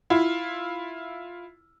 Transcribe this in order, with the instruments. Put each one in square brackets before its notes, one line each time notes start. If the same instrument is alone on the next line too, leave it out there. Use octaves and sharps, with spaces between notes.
[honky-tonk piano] E4 F4